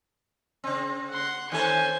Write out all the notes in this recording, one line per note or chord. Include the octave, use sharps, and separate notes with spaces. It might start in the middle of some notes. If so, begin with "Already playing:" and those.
C#3 C4
F#5 C6
D#3 C#4 A4 C5 G#5